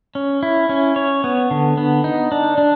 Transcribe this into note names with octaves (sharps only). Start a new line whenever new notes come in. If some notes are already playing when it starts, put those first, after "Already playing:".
C#4
E4
C#4
C#5
B3
D3
B3
D#4
D4
D4